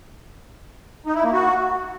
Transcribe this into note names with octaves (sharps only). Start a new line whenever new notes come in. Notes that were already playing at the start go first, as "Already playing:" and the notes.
D#4
E4
A#3
F#4